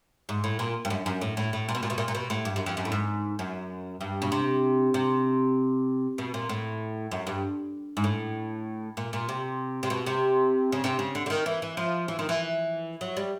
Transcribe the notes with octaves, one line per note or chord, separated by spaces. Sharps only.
G#2
A2
A#2
G2
F#2
F#2
A2
A2
A2
A#2
B2
A#2
B2
A#2
A#2
B2
A2
G2
F#2
F2
F#2
A2
G#2
F#2
G2
B2
C3
C3
B2
A#2
A2
F#2
G2
G#2
A2
A#2
A#2
C3
C3
B2
C3
C#3
C3
C#3
D3
D3
D#3
E3
E3
F3
E3
D#3
E3
F#3
G3